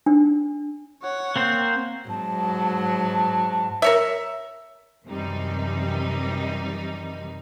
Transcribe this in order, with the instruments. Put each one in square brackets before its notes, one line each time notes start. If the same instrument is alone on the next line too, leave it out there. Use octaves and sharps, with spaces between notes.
[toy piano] D4
[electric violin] C#5 F#5
[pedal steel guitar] A#3 C4 C5
[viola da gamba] G#2 F#3 [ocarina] A5
[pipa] A#4 C#5 E5
[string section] F#2 C3 D#3 E3 G3 D#4